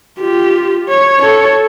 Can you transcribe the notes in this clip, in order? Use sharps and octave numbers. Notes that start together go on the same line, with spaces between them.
F4 G4
C#5
A4 C#5